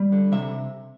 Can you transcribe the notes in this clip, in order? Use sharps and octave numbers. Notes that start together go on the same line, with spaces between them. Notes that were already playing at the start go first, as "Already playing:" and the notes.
Already playing: G3
D3
C3 E5